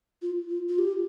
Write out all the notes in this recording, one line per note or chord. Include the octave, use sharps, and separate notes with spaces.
F4
F4
F4
G4